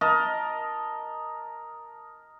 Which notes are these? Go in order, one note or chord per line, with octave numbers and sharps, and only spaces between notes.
A#4 D#5 A5